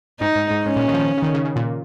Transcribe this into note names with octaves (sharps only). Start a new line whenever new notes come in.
G#2 D#4
G#2
G#2
G#2 C#4
A#2
D#3
F3
D#3
C#3
D#3
C#3
C#3
A#2